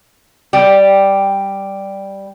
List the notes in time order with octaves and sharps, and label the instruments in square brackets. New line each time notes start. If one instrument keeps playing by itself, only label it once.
[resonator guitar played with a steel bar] G3 G4